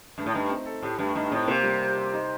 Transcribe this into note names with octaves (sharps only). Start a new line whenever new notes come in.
G2 A3
A2
G2 D#4
C4
A4
A2 G4
G2 A3
G2 D#4
A2 C4
C3 A#3
G3
C5
C5
D#4